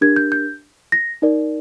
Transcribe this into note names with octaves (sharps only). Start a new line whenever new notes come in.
D4 G4 A#4 G#6
G6
G6
A#6
D#4 A#4 D5